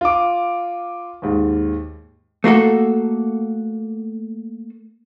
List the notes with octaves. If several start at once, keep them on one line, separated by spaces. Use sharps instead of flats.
F4 D6
D#2 G#2
A3 A#3 F#4 A4